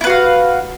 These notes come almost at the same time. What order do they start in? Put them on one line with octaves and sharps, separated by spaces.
E4 B4 F#4 F5